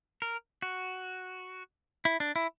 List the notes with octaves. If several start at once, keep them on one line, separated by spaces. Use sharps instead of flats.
A#4
F#4
E4
D4
E4